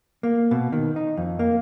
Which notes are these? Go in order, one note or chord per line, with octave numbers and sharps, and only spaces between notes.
A#3
B2
D#3
D#4
F2
A#3